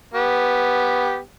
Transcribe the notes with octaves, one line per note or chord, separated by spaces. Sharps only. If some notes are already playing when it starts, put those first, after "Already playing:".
B3 G4